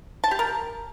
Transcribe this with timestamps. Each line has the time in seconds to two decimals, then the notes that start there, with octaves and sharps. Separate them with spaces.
0.24 A5
0.31 G4
0.39 A#4